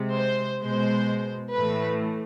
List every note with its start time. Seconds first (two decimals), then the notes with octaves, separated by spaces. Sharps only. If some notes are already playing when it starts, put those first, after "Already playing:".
Already playing: C3 G#3
0.15 C5
0.62 B2 G#3 C5
1.53 A2 E3 A3 B4